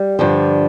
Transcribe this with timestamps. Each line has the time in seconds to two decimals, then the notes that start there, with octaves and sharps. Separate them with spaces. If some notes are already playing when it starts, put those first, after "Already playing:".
Already playing: G3
0.19 G2 D3 F3